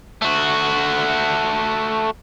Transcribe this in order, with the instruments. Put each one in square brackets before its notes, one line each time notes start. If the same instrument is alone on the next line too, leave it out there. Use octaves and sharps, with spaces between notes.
[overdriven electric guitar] A3 F#4